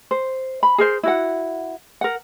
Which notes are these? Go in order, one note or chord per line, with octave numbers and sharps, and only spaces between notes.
C5
B5
G#4 A#4 C5
E4 F#4 F#5
A#4 F#5